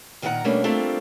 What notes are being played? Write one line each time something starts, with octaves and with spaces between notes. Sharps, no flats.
A#2 D#3 F#4 C#5 F#5 A#5
B2 G3 A3 A#3 C#4 D4
G3 A3 A#3 C4 D4 F4